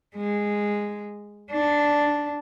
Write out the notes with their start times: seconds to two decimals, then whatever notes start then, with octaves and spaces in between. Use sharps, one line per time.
0.17 G#3
1.51 D4